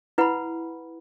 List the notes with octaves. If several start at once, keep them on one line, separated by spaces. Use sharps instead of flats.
E4 B4 F#5 B5